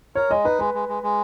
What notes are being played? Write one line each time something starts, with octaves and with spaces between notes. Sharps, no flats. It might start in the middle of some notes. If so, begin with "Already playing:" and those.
A#4 C#5
G#3 D#5
D#4 B4
G#3 B4
G#3
G#3
G#3